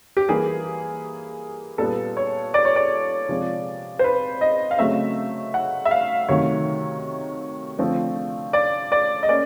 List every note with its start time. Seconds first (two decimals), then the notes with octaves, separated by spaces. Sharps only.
0.17 G4
0.29 E3 G3 A#3 G#4
1.78 A#2 G3 B3 A4
2.17 C#5
2.54 D5
2.65 C#5
2.76 D5
3.29 C3 F3 G#3
3.99 C5
4.04 B4
4.41 D#5
4.71 F5
4.79 C#3 F#3 A3 C4 E5
5.54 F#5
5.85 E5
5.91 F5
6.29 C3 D#3 F#3 A3 C#5
7.78 D3 F3 A3 C4
8.53 D5
8.92 D5
9.23 D#5
9.29 A#3 C#4 D5